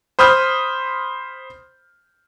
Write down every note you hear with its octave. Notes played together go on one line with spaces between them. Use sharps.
C5 B5 D#6 F6 G6